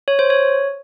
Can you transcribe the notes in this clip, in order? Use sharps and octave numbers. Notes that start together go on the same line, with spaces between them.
C#5
C5
C#5